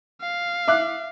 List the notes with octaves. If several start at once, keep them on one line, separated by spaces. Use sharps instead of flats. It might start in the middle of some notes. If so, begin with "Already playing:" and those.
F5
E5 D6 F#6